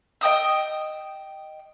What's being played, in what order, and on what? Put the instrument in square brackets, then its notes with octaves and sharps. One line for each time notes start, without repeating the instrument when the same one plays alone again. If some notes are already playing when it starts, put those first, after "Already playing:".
[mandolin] D#5 G5 D#6 E6